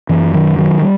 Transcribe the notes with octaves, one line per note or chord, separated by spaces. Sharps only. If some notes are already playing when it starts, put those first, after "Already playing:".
F#2 E3
D#3 F#3
D#3 F#3
G3